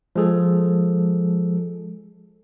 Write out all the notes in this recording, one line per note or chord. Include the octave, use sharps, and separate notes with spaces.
F3 G#3 G#4 A4